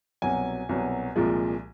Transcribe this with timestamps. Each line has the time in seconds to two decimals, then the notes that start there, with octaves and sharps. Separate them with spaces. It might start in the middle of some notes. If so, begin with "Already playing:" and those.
0.22 C2 B2 F#3 G#5
0.69 C2 B2 F#3
1.16 C2 A#2 F3 G#3